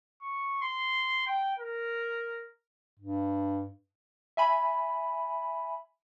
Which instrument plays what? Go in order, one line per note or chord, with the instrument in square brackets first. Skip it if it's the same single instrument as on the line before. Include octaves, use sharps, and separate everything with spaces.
[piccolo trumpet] C#6
C6
G5
A#4
[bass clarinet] G2
[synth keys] E5 G#5 B5